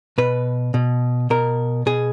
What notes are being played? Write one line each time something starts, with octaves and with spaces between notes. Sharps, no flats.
B2 B4
B2
B2 A#4
B2 G#4